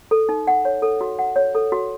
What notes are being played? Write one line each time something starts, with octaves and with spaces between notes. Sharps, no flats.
A4
D#4
F#5
C#5
A4
F#4
F#5
C#5
A4
F#4